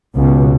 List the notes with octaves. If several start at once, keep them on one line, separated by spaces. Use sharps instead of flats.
C#2 B2